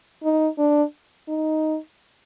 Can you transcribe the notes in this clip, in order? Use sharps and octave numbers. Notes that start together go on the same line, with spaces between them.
D#4
D4
D#4